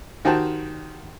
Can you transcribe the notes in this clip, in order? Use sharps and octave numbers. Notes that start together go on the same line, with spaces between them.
D#3 F#4 G4 C5 A5